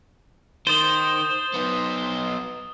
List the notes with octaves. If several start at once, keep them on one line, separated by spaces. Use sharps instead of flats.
D#3 C5 D#6 A6 G7
B3 D#4